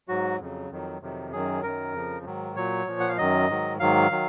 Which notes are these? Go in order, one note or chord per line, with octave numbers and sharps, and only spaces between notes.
G#2 F#3 F#4
F2 C#3 F#3
F2 D#3 F#3
F2 C3 D#3 F#3
F#2 D#3 F#3 G#4
F#2 D#3 F#3 A#4
F2 C#3 F3
G#2 D#3 F#3
A#2 F#3 C#5
A#2 F3
F#5
F5
F#2 D#3 F#3 D#5
G#2 D#3 F#3
G#2 D#3 F#3 F5
D#3 F#3